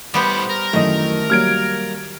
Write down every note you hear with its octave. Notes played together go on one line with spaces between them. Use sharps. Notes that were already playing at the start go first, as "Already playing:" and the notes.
A2 G3 B3 C5 F#5
A#4
F#2 D#3 E3 A3 D#5
F#3 G3 A#3 F6 G#6 D7